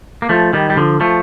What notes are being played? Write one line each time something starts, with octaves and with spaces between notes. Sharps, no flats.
A#3
F3 A3
D#3 G3
G3
D3 F3
F3 A3